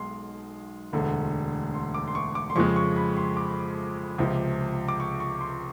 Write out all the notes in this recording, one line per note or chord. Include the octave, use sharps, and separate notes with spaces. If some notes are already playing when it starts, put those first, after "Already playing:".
Already playing: B1 B2 G#3 C6
E1 D2 D3
C6
D6
C6
C#6
D6
C6
F2 C#3 F3 G#3 C#6
C#6
B5
C6
D6
C#2 C3 F3
D6
C#6
C#6
C6